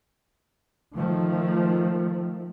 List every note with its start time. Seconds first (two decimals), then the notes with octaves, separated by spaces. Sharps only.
0.94 D#3 F3 A3